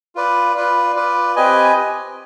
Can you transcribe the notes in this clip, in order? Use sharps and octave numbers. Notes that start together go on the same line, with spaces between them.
F4 B4 D5
F4 B4 D5
F4 B4 D5
C4 G4 B4 D#5 G#5